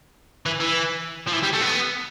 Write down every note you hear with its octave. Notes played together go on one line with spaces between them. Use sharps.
E3
E3
F3
E3
G3
A3
B3